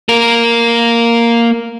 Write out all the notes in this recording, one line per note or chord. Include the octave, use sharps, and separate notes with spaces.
A#3 A#4